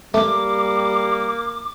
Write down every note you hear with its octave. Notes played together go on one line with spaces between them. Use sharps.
G3 A3 A#3 D6